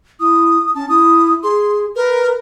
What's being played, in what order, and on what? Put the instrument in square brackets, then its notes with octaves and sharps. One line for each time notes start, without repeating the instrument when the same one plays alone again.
[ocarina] E4 [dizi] D#6
[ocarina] C#4 [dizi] A5
[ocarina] E4 [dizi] D#6
[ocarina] G#4 [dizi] C6
[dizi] A#4 [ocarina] B4